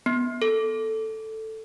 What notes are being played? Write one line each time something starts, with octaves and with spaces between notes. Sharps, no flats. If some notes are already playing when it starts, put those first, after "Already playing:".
B3
A4